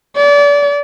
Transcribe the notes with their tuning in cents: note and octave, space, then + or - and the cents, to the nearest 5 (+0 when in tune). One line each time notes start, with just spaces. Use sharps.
D5 -30